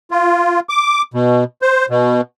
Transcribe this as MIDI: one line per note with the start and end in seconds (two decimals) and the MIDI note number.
0.11 0.60 65
0.69 1.02 86
1.14 1.44 47
1.62 1.86 72
1.90 2.21 47